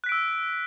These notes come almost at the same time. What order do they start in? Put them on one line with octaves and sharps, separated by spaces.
F#6 B6 D7 E6